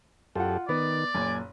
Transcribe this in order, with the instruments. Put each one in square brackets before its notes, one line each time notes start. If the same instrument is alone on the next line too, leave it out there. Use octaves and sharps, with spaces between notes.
[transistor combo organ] F#2 G4 A4 [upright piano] F4 F#5
[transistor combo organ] D#3 [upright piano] B3 [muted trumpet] D5
[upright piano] F#1 A#2 [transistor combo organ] G#5